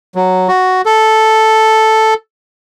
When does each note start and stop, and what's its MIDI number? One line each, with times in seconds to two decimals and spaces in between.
0.15 0.48 54
0.48 0.82 66
0.86 2.14 69